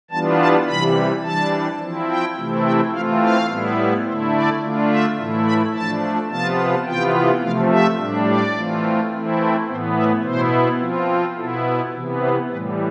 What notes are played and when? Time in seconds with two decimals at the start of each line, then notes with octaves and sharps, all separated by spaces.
0.11 E3 G3 B3 D4 F4 A5
0.39 A5
0.67 C3 E3 G3 B5
1.23 E3 G3 D4 A5
1.80 F3 C4 E4
2.08 G5
2.36 C3 E3 A3 C4 E4
2.64 G5
2.92 E3 A3 C4 F4 F5
3.21 F5
3.48 A2 G3 B3 E4
4.05 D3 A3 E4 C5
4.32 D5
4.61 D3 A3 D4 F4
4.89 E5
5.17 A2 E3 A3 E4
5.45 B5
5.73 F3 A3 D4 A5
6.30 C3 F3 B3 F4 A5
6.86 C3 E3 B3 F4 G5
7.42 C3 F3 A3 F5
7.70 E5
7.98 A2 G3 D4
8.27 D5
8.55 E3 A3 C4 F4
9.12 E3 A3 C4 E4
9.39 C5
9.67 A2 E3 B3 C5
9.96 E5
10.24 B2 B3 E4 C5
10.79 F3 C4 F4
11.36 B2 B3 E4 A4
11.93 C3 E3 B3
12.20 C5
12.48 A2 E3 G3 B4